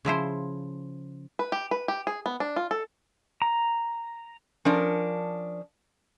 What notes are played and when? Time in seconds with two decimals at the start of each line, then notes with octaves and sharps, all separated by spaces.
0.05 C#3 F3 E4 C5
1.39 B4
1.52 G4
1.71 B4
1.88 G4
2.07 G#4
2.26 B3
2.40 D4
2.56 F4
2.71 A4
3.42 A#5
4.65 F3 C#4 D4 A#4